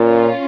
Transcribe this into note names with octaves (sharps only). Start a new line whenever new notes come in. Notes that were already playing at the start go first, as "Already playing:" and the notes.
Already playing: A#2 C#4 F4